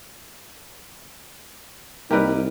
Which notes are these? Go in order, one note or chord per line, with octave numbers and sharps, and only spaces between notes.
C2 G3 A#3 D#4 G4 A#4 B4